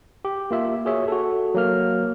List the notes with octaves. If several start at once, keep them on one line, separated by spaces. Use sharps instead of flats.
G4
A#3 F4 E5
F#4 G#4 C#5 E5
F#4 A4
F#3 A#3 F6